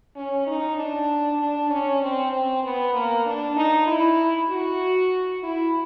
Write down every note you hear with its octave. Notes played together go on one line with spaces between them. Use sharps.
C#4
D#4
D4
D4
C#4
C4
C4
B3
A#3
D4
D#4
E4
F#4
E4